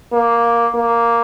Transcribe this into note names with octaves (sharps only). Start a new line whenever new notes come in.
A#3
A#3